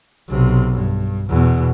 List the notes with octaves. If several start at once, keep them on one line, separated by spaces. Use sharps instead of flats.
B1 C3
G2
E2 B2